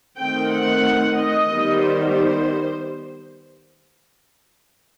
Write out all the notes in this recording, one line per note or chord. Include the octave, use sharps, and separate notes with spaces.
D#3 A3 C4 G5
F#5
D#5
D#3 G3 B3
C5
C5